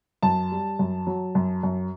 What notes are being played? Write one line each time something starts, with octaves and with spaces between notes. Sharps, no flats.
F#2 A5
G3
F#2
F#3
F#2
F#2